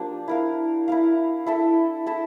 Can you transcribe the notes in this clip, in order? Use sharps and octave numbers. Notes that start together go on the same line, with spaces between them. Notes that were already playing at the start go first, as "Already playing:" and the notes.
Already playing: F3 A#3 D4 G4
E4 A#4 F5
E4 A#4 F5
E4 A4 E5
E4 A4 E5